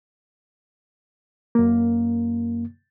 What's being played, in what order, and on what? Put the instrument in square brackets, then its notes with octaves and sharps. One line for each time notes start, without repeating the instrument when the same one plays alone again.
[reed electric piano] F#2 A#3